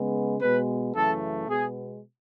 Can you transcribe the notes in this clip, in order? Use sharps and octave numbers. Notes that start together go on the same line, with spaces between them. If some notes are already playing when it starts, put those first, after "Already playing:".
Already playing: C#3 G#3 B3
B2 G#3 B3 B4
F#2 C#3 E3 A3 A4
B2 G#3 B3 G#4